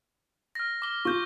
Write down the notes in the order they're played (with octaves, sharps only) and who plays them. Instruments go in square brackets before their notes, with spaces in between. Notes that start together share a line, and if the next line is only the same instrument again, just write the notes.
[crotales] F6 A#6
D6 G7
[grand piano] F4 [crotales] C#6 G6